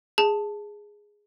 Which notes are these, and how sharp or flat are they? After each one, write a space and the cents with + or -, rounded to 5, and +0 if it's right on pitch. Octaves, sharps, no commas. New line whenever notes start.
G#4 -5 A5 +0